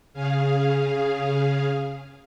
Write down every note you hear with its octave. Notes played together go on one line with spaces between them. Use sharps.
C#3 G#4 F5